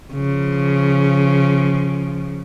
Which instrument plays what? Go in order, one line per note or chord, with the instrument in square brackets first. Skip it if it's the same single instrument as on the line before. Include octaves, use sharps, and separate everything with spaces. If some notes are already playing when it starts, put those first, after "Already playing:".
[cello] C#3 F3